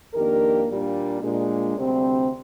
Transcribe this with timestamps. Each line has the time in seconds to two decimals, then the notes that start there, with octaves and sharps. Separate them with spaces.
0.14 F2 D#3 A#3 D4 G4 A#4
0.68 A#2 G3 A#3 D4
1.22 A#2 G#3 D4
1.77 D2 C3 G3 C4